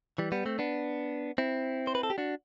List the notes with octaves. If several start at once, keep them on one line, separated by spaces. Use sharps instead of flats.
E3 G3
G3 B3
A3 C4
B3 D4
C4 E4
C5
B4
A4
G4
D4 F#4